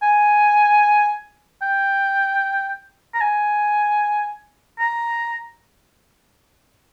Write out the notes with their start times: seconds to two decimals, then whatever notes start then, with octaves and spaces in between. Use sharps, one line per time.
0.03 G#5
1.62 G5
3.14 A#5
3.21 G#5
4.79 A#5